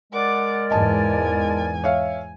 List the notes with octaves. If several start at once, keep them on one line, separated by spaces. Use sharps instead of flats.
G#3 A#4 D5 F#5 D6
E2 G#2 D#5 G#5 A5
C#5 E5 F5